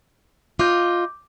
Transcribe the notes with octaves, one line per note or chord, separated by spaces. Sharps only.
F4 D#5 D6 G6